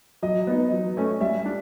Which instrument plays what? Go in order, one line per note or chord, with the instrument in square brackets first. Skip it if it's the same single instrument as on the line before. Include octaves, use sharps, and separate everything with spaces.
[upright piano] F#3 [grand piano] D#5
[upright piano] B3 D#4
F#3
A3 C#4
[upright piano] G3 [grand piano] E5
[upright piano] D4